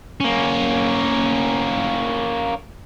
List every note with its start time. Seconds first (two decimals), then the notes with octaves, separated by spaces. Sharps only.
0.20 A#3 C#4